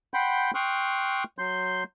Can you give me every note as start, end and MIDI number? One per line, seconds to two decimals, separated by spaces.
0.14 0.51 78
0.14 0.51 79
0.14 0.51 83
0.14 0.51 84
0.14 0.51 91
0.55 1.24 79
0.55 1.24 84
0.55 1.24 85
0.55 1.24 87
0.55 1.24 89
0.55 1.24 90
1.38 1.84 54
1.38 1.84 84
1.38 1.84 91